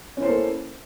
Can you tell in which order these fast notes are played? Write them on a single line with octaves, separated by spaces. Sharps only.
C#4 E4 C5 A4 A#3